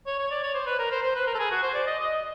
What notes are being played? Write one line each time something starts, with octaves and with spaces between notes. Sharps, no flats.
C#5
C#5
D5
C#5
C5
B4
A#4
C5
C5
B4
A#4
A4
G#4
F#4
C5
D5
D#5
D#5